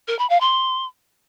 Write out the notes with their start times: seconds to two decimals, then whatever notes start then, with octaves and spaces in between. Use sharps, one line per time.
0.08 A#4
0.19 B5
0.30 F5
0.41 C6